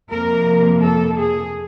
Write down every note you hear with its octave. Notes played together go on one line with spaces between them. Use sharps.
F2 C3 F3 A#3 A#4
A4
G#4